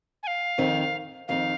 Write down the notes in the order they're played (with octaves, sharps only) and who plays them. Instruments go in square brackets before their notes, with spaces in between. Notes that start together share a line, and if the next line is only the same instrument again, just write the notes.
[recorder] G#5
F5
[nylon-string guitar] F2 D#3 C4 D#4
[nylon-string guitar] F2 D#3 C4 D#4 [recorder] F5